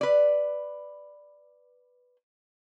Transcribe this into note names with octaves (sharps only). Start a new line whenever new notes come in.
B4 D5